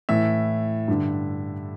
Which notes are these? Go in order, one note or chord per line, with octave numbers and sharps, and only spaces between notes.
A2 E3 E5
G2 D3